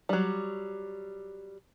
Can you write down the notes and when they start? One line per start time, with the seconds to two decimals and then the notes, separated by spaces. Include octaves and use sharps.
0.09 F#3 G3